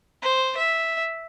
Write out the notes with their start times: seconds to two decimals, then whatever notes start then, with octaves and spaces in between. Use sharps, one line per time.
0.22 C5
0.57 E5